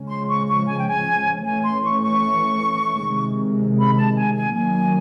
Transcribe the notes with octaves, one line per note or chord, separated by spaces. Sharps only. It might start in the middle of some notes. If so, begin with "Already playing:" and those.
Already playing: C#3 F3 G#3 C#4
C6
C#6
C#6
G#5
G5
G#5
E3 A3 C#4 G#5
C6
C#6
C#6
C3 D#3 G#3
B5
A5
G#5
G#5
D#3 F#3 A#3 C#4 G#5